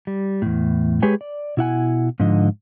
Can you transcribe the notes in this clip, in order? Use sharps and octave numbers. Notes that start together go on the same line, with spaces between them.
G3
E2 A2
G#3 G4 G#4 B4 C#5 G#5
D5
B2 E4 F#5 G#5
G#2 D3 F3 D#5